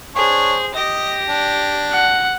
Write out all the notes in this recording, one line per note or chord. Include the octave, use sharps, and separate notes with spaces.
D4 G#4 C5 C#5
G4 D#5 A#6
D4
F#5